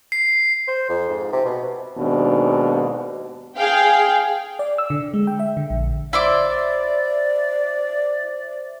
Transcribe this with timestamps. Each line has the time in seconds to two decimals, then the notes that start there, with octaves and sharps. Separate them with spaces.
0.12 C7
0.68 C5
0.89 F2
1.09 G#2
1.33 C3
1.45 B2
1.98 D#2 G#2 B2 D4
3.57 G#4 F5 G5
4.59 D5
4.78 E6
4.90 D3
5.14 G#3
5.27 G5
5.39 E5
5.57 D3
5.70 A#1
6.13 E4 C5 D5 E5 C6 D6